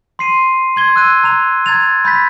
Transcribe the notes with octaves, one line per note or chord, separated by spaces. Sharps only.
C6 C7 D#7
C6 G#6 G7
E6 F#6 D#7
A#5 F7
A#5 G#6 A6 F7
B5 G6 A6 B6